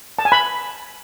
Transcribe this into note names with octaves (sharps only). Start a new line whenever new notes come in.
A5
G#5
B5